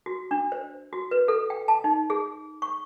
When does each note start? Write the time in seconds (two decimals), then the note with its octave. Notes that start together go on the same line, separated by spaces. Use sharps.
0.06 F#4
0.31 D4
0.52 C5
0.93 F#4
1.11 B4
1.28 A4
1.50 G5
1.68 A5
1.84 D#4
2.10 G#4
2.62 C#6